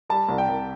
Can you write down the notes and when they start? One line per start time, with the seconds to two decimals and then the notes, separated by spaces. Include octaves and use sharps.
0.10 G3 A5
0.28 C2
0.38 G5
0.49 C2